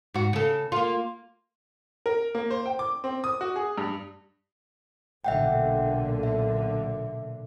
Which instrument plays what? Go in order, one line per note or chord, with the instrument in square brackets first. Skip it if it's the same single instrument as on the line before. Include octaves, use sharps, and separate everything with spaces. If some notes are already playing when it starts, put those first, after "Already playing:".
[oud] G#2 F#4
C#3 A4
A#3 F4
[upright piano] A#4
A#3
C5
G5
D6
C4
D#6
F#4
G#4
G2
[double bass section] B1 A#2 D3 [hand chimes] E5 F#5 G5
[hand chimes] E5